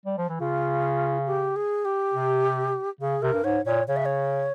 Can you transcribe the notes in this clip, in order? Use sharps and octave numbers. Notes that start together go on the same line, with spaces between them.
G3
F3
E3
C#3 F4
G4
G#4
G4
C3
C#3 G#4
C3 A#4
G2
G#2 C#5
A#2 C#5
C#3 C#5
E5
C#5